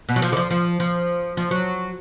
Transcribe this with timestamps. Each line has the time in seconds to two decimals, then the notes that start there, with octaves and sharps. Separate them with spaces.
0.09 B2
0.16 F#3
0.22 F3
0.32 D3
0.37 F3
0.51 F3
0.80 F3
1.37 F3
1.51 F#3